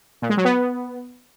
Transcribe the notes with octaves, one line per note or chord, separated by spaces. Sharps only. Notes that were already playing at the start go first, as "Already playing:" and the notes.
A#2
G#3
F#3
B3